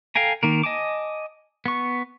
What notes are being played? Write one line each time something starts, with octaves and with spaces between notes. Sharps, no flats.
A4 F5 G5 G#5 A#5
D#3 A#3 A#4
D#5 G#5 A5 D6
B3 C#6